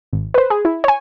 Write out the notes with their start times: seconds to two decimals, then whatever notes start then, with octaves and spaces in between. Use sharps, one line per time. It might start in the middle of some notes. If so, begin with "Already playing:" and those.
0.13 G#1
0.34 B4 C5
0.50 G#4
0.65 E4
0.84 C#5 G#5